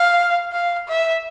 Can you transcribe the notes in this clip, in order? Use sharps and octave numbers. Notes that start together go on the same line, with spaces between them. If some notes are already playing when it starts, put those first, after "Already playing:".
Already playing: F5
F5
E5